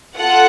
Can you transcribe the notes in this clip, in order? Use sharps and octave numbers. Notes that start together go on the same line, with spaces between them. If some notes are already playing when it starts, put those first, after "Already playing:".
F4 A4 F#5